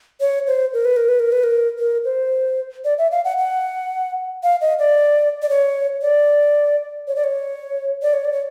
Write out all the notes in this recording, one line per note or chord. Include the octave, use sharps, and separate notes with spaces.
C#5
C5
A#4
B4
A#4
B4
A#4
B4
A#4
A#4
C5
D5
E5
F5
F#5
F#5
F5
D#5
D5
D5
C#5
D5
C#5
D5
C#5
D5
C#5
D5
C#5